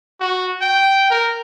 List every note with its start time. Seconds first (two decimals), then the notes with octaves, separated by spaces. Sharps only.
0.20 F#4
0.62 G5
1.10 A#4